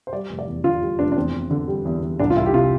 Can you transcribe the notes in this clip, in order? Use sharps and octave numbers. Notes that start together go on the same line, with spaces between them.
C5
G3 D5
F1
D5
E2
D3 F4
G3
F1 D4
D4
E2 C4
E2
D3
G3
E2
E2
C2 D4
F4
C2 E4
G4
C3 F4